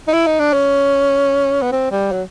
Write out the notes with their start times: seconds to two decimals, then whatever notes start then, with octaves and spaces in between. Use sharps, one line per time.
0.08 D#4
0.13 E4
0.27 D#4
0.40 D4
0.53 C#4
1.62 B3
1.72 C4
1.92 G3
2.12 F#3